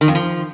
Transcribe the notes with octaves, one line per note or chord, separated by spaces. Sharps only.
D#3
F2
F3